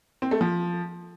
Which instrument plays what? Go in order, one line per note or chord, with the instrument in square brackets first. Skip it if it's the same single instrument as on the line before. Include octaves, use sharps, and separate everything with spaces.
[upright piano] C4
A3
F3